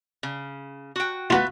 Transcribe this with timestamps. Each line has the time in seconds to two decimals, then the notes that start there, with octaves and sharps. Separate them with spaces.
0.23 C#3
0.96 F#4 G5
1.30 A3 B3 F4 F#4 B4